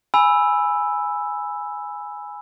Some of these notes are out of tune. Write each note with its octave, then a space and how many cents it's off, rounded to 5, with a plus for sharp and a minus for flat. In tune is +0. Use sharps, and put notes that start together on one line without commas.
G#5 +0 B5 +0 E6 +0